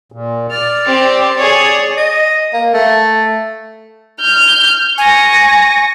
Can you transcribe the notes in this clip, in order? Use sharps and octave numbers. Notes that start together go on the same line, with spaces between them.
A#2
D5 F6
C4 G4
G#4 C#5
D#5
A#3
A3
F6 G6
G#5 C#6 A#6